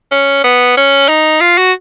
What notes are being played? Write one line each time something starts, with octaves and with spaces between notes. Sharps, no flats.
C#4
B3
C#4
D#4
F4
F#4